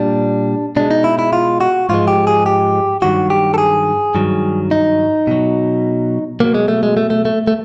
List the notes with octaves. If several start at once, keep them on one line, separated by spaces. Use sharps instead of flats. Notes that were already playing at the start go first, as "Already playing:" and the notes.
Already playing: A#2 G3 D4
B2 G#3 D4
D#4
E4
E4
F4
F#4
G#2 F3 G#3 F4
G4
G#4
G4
G2 D#3 F#3 F#4
G4
A4
G#4
G2 D#3 F#3
D#4
B2 F#3
B2 F#3 A#3
G#3
A3
G#3
A3
A3
A3
A3